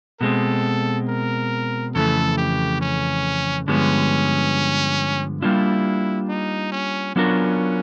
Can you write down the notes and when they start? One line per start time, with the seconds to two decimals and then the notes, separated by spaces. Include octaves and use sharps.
0.20 B2 G#3 C4 A4
1.08 A#4
1.95 F2 C#3 E3 A3 A4
2.37 G4
2.81 C#4
3.68 G2 D3 F3 G#3 B3 C#4
5.41 G3 A#3 D4 E4 F4
6.28 D#4
6.72 C#4
7.15 F#3 B3 C#4 D4 F4 A#4